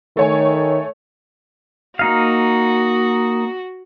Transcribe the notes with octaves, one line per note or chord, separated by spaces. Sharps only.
D#3 A3 C#5 G#5
A#3 D#4 F#4 F5